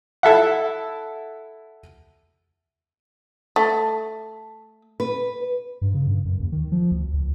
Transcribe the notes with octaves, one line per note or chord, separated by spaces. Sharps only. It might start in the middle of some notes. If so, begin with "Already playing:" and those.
E4 A4 E5 F#5
A3
B4
G2
C#3
G2
F#2
D#2
D#3
F3
D2
C#2